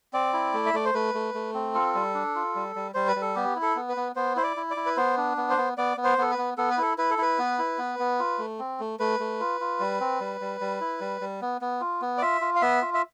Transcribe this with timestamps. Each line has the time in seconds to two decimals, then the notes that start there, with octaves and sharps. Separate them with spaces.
0.13 C4 D5
0.33 E4
0.54 A3
0.66 E5
0.74 A3 D5
0.85 C5
0.94 A3 B4
1.14 A3
1.34 A3
1.54 C4
1.75 F4 A4
1.95 G3
2.14 D4
2.35 F4
2.55 G3
2.76 G3
2.94 G3 C5
3.08 B4
3.16 G3
3.22 A4
3.35 B3 G4
3.56 E4
3.62 A4
3.76 B3
3.89 B4
3.97 B3
4.16 B3 C5
4.36 E4 C5
4.43 D5
4.57 E4
4.70 D5
4.77 E4
4.86 B4
4.97 B3 C5
5.17 D4
5.37 B3
5.50 C5
5.58 B3
5.77 B3 D5
5.97 B3
6.04 C5
6.18 B3 A4
6.31 B4
6.38 B3
6.57 B3 A4
6.70 B4
6.78 E4 A4
6.98 E4 B4
7.11 A4
7.18 E4 B4
7.39 B3
7.59 E4
7.78 B3
7.99 B3
8.19 F4
8.39 A3
8.59 C4
8.80 A3
9.00 A3 B4
9.20 A3
9.40 F4
9.61 F4
9.80 G3
10.01 C4
10.21 G3
10.41 G3
10.61 G3
10.81 E4
11.01 G3
11.21 G3
11.42 B3
11.61 B3
11.81 F4
12.02 B3
12.18 D5
12.22 F4 E5
12.41 F4
12.56 F5
12.62 B3 E5
12.82 F4
12.94 E5